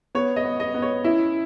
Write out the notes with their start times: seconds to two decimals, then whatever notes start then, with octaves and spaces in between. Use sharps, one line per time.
0.15 B3 C#5
0.36 D#5
0.44 B3
0.60 D#5
0.74 B3
0.82 C#5
1.04 C#4 E4